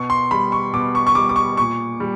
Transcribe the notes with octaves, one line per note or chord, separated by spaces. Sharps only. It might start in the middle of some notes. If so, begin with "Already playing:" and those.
Already playing: B2 C#6
C6
G3 B5
C#6
B2 D6
C#6
C#6
G3 D6
D6
C#6
A#2 C#6
G3